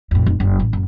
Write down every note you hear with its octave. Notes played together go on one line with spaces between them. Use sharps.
F2 A2
F1
F#1
A1
F#1